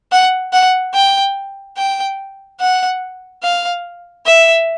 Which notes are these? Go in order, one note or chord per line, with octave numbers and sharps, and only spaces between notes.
F#5
F#5
G5
G5
F#5
F5
E5